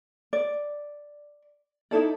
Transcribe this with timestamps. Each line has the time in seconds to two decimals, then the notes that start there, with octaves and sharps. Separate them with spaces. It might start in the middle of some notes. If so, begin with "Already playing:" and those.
0.33 D5
1.91 D#4 E4 A4 D5